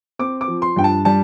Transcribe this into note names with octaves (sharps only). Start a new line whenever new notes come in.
C4 D6
D6
F3
C6
G2 G5
A5
G3 A5